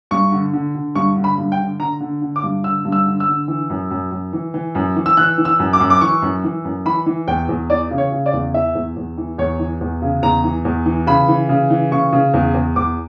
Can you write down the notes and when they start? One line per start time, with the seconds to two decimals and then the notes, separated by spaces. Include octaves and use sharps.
0.11 G2 C#6
0.32 D3
0.53 D3
0.75 D3
0.95 G2 C#6
1.16 D3
1.24 B5
1.38 G2
1.52 G5
1.59 D3
1.80 D3 A#5
2.00 D3
2.22 D3
2.36 D6
2.43 G2
2.64 D3 E6
2.85 G2
2.92 E6
3.06 D3
3.20 E6
3.28 D3
3.48 E3
3.70 F#2
3.91 F#2
4.11 F#2
4.33 E3
4.54 E3
4.75 F#2
4.96 E3
5.06 E6
5.17 E3 F#6
5.38 E3
5.45 E6
5.59 F#2
5.73 D6
5.80 F#2
5.90 D6
6.01 E3 C#6
6.22 F#2
6.44 E3
6.64 F#2
6.85 E3 B5
7.06 E3
7.28 E2 G5
7.49 E2
7.70 E3 D5
7.91 C#3
7.98 C#5
8.13 C#3
8.26 D5
8.33 E2
8.54 E3 E5
8.75 E2
8.96 E2
9.17 E3
9.38 E2 C#5
9.59 E3
9.81 E2
10.02 C#3
10.23 E2 A#5
10.44 E3
10.65 E2
10.86 E3
11.07 C#3 B5
11.28 E3
11.49 C#3
11.70 E3
11.91 C#3 C#6
12.12 C#3
12.34 E2
12.54 E2
12.76 E2 D6